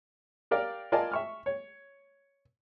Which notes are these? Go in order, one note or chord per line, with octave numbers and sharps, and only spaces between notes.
G4 A#4 D5 F5 G5
F4 A#4 D5 D#5 G#5 A5
E5 C#6 F6
C#5